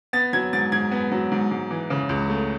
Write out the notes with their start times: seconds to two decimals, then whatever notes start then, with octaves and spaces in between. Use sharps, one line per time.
0.13 B3 A6
0.33 F#3 G#6
0.53 G#2 A6
0.72 G#2 G#6
0.92 B3
1.11 F#3
1.31 G#2
1.51 G#2
1.70 E3
1.90 C#3
2.09 C#2
2.29 A3